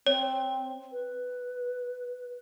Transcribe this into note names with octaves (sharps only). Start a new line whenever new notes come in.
C4 C#5
B4